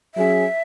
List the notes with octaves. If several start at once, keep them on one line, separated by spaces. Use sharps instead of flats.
F#3 C#4 G#4 E5